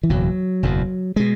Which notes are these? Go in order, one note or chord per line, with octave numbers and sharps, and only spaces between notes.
E3
F#1 E2 B2 F#3
F#1 E2 B2
B2 G#3